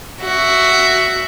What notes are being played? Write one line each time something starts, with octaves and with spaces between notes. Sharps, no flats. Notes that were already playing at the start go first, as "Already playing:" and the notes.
F#4 E5